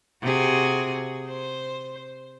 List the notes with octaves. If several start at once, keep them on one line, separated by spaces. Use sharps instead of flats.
C3 F#4 G#4
C5